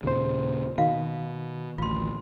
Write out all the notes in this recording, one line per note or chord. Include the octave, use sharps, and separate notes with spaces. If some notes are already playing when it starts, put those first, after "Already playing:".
D#2 A#2 C#3 C5
B2 D#3 F#4 F5
A1 D2 F4 C6